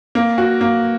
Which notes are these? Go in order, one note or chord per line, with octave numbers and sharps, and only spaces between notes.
A#3
F#4
A#3